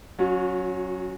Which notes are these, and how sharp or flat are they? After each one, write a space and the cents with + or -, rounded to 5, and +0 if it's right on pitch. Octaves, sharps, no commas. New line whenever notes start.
F#3 +0 C#4 +0 F#4 -40